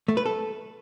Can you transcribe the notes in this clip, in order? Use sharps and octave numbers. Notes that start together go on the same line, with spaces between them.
A3
B4
A4